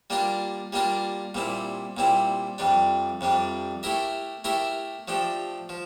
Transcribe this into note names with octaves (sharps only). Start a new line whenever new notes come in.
G3 A#3 D4 F4 A#4
G3 A#3 D4 F4 A#4
A#2 G3 C4 E4
A#2 G3 C4 E4
F2 C3 G3 D4
F2 C3 G3 D4
A3 E4 G4 A#4 E5
A3 E4 G4 A#4 E5
F3 A3 D4 G4
F3